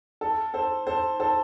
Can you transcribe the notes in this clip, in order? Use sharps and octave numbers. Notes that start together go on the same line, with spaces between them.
A4
A4 C5
A4 C5
A4 C5